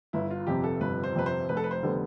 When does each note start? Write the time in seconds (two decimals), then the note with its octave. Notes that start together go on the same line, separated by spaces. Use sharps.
0.13 G1 E4
0.31 F4
0.47 F2 C3 G4
0.64 A4
0.81 G1 B4
1.04 C5
1.16 F2 C3 B4
1.26 C5
1.49 F1 B4
1.57 A4
1.64 B4
1.71 C5
1.83 D3 G3 B3